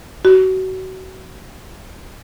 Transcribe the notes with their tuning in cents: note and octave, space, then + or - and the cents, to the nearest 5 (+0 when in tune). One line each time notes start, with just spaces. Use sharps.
F#4 +30